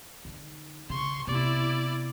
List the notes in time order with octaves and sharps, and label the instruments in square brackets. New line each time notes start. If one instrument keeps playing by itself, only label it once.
[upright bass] D3 D#4
[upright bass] C#3 [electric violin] C6 C#6
[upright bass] C3 B3 [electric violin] E4 D5